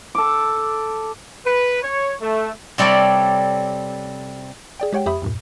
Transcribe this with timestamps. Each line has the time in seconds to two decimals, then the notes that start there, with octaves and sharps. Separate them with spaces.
0.15 A4 D6
1.45 B4
1.83 C#5
2.22 A3
2.78 C3 G3 A4 C#5 D5
4.80 G#4 D5 G5
4.93 G#3 G4 C#5 F#5 G5
5.06 F2 G4 E5 B5 D#6
5.22 E2 G2 A#2